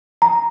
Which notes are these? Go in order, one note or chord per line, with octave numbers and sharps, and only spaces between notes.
A#5